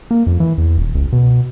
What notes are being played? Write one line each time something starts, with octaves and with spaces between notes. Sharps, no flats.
A#3
F2
E3
E2
D#1
C#2
B2